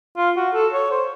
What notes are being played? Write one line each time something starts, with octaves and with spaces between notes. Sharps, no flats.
F4
F#4
A4
C#5
C5